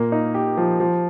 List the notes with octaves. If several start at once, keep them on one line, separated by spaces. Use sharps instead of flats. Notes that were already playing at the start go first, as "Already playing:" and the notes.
Already playing: A#2 A#3
D#4
G4
F3
F3